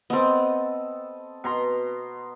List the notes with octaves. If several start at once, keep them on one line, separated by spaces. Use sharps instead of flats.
B3 C4 A4 D#5
B2 A#5 C6